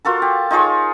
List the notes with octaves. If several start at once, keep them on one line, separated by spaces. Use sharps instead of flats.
F4 F#4 A4 A#4
G4
D#4 F4 G#4 C#5